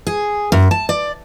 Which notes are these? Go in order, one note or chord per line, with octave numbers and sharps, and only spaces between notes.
G#4
F#2
A5
D5